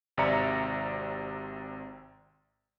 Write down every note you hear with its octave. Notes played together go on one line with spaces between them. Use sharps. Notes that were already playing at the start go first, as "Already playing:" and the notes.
G#1 C3 D5 E5 A#5 C#7